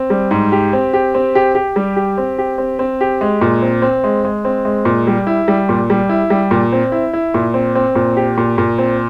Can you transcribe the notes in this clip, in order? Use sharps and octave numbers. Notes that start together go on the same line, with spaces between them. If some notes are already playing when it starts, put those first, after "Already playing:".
Already playing: C4
G3
G#2
G4
C4
G4
C4
G4
G4
G3
G4
C4
G4
C4
C4
G4
G#3
A#2
C4
C4
G#3
G#3
C4
G#3
A#2
G3
E4
G3
A#2
G3
E4
G3
A#2
C4
E4
E4
A#2
C4
C4
A#2
G4
A#2
A#2
C4